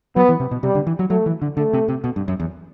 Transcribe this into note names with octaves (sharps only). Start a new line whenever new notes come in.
F#3 B3
E3
C3
B2
C3 G3
D3
E3
F#3
F#3 A3
E3
D3
D3 A3
C3
C3
B2
G2
F#2
E2